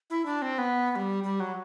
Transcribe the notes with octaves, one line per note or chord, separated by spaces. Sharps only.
E4
D4
C4
B3
B3
G3
G3
F#3